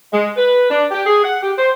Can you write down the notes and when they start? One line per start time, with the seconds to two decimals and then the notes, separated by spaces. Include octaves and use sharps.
0.12 G#3
0.37 B4
0.70 D4
0.91 G4
1.06 G#4
1.23 F#5
1.43 G4
1.58 C5